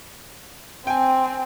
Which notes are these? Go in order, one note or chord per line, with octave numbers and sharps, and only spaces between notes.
C4 G5 G#5